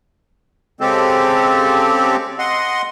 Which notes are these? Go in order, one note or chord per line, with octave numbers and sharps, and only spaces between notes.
C#3 G#3 C4 G4 A4
D#5 F#5 C6